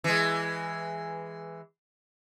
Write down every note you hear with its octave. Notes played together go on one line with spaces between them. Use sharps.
E3 G#3